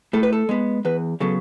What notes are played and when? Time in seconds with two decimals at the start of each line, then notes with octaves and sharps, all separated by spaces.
0.13 A2 A4
0.23 B4
0.33 A4
0.49 G#3 B3
0.85 E2 B4
1.20 C#3 F#3 B3 A4